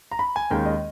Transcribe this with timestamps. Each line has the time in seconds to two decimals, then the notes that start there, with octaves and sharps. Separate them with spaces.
0.11 A#5
0.19 B5
0.36 G#5
0.50 D#2 D#3 G#3 C#4 G5
0.66 D#5